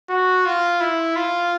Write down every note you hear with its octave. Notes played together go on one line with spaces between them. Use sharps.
F#4
F4
E4
F4